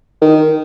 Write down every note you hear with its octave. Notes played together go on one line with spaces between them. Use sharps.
D#3